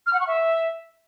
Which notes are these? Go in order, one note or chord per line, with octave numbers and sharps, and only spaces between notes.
F6
F#5
C#6
E5